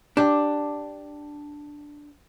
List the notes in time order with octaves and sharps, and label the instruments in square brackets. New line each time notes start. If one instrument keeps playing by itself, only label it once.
[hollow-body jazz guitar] D4 G4